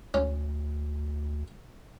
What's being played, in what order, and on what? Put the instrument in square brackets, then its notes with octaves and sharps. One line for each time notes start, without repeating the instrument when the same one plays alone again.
[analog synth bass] D2 [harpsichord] C#4